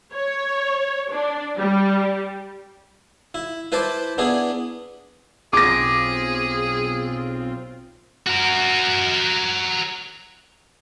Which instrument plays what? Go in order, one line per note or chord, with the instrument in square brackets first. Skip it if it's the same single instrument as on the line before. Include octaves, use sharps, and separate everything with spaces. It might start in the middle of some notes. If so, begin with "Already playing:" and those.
[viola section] C#5
D4
G3
[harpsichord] E4
E4 B4 C5 A5 D6
B3 D4 E4 G#4
[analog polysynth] B1 C4 F4 [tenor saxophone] G#4 [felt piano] D6 A#6
[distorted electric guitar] F#4 A#4